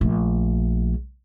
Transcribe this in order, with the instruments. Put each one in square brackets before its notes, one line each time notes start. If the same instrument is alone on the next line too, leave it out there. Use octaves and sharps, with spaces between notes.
[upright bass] A#1 A3